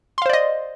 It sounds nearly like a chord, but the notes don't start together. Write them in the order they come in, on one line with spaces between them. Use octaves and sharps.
C6 F5 C5 D5 D#5